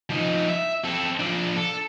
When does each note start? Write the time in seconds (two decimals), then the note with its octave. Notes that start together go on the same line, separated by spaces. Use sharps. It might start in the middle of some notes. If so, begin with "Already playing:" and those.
0.10 F3 D#4
0.49 E5
0.84 C4 A4
1.19 F3 D4
1.56 A4